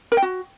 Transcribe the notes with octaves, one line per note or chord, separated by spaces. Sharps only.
A#4
G5
F#4